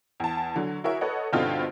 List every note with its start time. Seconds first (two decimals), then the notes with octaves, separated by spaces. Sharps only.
0.20 E2 A5
0.56 D3 F#3
0.84 E4 F#4 G#4 A#4 C#5 E5
1.01 A4 B4 C#5 D#5 F#5
1.33 G2 B2 D3 C4 D#4 F4